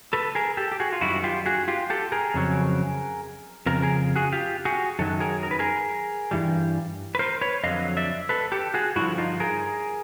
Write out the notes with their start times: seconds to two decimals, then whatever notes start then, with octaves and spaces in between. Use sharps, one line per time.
0.13 A4 B4
0.35 G#4 A#4
0.57 G4 A4
0.72 G4
0.80 F#4 G#4
0.92 F4
1.01 F#2 D#3 G3 E4 F#4
1.24 F4 G4
1.46 F#4 G#4
1.68 F4 G4
1.90 G4 A4
2.12 G#4 A#4
2.34 F2 C#3 F#3
3.66 F2 C#3 A#4
3.82 G#4 A#4
4.16 F#4 G#4
4.32 F4 G4
4.65 F#4 G#4
4.99 F#2 D#3 F#3 A4
5.20 G#4 A#4
5.43 A#4
5.51 B4
5.59 G#4 A#4
6.31 G2 E3 G3
7.15 B4
7.19 A#4 C5
7.41 B4 C#5
7.64 F2 D3 F#3 D#5 F5
7.97 D5 E5
8.29 A4 B4
8.52 G4 A4
8.74 F#4 G#4
8.96 G2 D3 F3 E4 F#4
9.18 D#4 F4
9.40 G#4 A#4